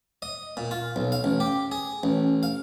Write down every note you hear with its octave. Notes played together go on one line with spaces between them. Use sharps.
D#5
A#2
F4
B1
F5
A1
G4
G#4
A1
F5